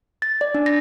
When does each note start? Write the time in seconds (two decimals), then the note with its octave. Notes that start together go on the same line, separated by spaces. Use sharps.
0.22 A6
0.41 D5
0.54 D4
0.66 A#6